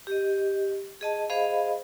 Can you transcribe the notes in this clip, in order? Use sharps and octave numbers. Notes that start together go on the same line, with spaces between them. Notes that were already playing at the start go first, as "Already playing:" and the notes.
G4 D#5
G#4 D#5 A5
G#4 C5 D#5 F5 B5